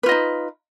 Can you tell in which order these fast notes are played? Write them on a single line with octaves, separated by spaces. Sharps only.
B4 F4 D#5 D#4